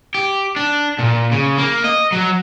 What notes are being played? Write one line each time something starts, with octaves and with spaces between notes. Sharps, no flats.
G4
D4
A#2
C#3
A#3
D#5
F#3